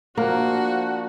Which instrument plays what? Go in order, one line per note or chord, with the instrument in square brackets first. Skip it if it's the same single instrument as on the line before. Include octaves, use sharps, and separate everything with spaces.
[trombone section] F3 D4 [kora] A#3 [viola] F#4